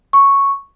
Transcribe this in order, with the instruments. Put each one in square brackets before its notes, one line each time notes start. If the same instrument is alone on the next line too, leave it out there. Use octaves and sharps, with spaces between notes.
[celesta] C#6